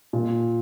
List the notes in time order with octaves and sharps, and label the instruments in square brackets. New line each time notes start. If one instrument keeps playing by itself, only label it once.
[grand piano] A#2